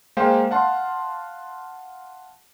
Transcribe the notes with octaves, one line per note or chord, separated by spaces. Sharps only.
G#3 A#3 C5 F5 G5
F5 F#5 A5 C6